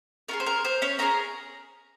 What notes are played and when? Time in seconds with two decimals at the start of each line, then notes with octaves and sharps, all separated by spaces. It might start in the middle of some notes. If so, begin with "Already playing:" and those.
0.28 C#4 F4 G#4 A#4
0.40 C5
0.46 A#4
0.65 C5
0.82 C#4 C#5
0.99 C#4 F4 G#4 A#4 A#5